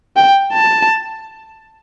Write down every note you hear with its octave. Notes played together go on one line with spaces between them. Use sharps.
G5
A5